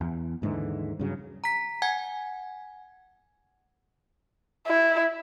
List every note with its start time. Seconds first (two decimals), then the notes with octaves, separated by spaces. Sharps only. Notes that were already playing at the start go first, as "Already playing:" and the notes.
0.01 E2
0.42 D#2 G#2 D3 E3
0.99 G2 C#3 F#3
1.44 A#5 B6
1.82 F#5 G#5 G#6
4.67 E4